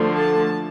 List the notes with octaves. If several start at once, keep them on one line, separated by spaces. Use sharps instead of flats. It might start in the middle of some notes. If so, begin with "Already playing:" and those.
Already playing: D3 F3 A3
A5